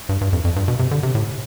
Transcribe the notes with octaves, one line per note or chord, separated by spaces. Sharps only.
G2
G2
F2
F2
G2
B2
C3
D3
C3
A2